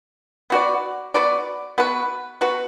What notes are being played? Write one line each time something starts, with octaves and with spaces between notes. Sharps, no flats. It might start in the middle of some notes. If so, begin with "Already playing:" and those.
B3 F#4 B4 D5
B3 F#4 B4 D5
B3 F#4 B4
B3 F#4 B4